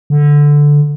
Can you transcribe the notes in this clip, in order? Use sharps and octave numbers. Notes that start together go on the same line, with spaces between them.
D3